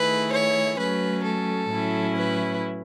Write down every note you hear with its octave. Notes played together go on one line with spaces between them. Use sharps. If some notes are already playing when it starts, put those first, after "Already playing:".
Already playing: D#3 A3 E4 G#4 B4
C#5
F#3 A3 C#4 B4
A4
A2 F#3 C#4 E4
B4